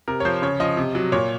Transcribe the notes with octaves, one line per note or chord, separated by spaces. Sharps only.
C3 A#4
C#5
F3 C5
C#3 C#5
F3 D#5
C3
F#3
A#2 C#5